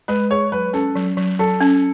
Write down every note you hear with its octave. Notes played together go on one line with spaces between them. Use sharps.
G#3 B4
G#4 C#5
F#3 B4
C#4 A4
F#3
F#3
F#3 A4
C#4